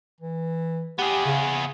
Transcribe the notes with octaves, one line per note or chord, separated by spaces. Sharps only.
E3
B3 G4 G#4
C#3
C#3